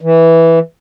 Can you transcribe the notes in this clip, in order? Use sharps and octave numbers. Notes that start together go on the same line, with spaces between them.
E3